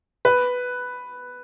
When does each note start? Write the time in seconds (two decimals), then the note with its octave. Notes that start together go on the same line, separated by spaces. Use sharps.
0.25 B4